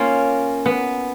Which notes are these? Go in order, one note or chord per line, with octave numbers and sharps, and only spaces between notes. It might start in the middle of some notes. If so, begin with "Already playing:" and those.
Already playing: A#3 C#4 F4
B3